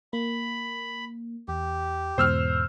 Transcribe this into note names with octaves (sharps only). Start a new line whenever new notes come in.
A#3 B5
E2 G4
E2 G#2 B2 C5 E6 F6